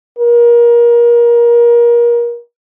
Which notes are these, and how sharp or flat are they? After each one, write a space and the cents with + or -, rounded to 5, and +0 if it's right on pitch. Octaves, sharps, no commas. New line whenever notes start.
A#4 +30